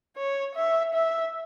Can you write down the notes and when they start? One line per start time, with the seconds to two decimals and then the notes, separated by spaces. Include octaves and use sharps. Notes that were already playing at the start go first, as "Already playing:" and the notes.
0.17 C#5
0.55 E5
0.94 E5